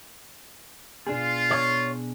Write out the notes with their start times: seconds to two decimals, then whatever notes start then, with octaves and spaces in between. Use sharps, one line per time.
1.07 B2 D4 F4 G#4
1.51 C#5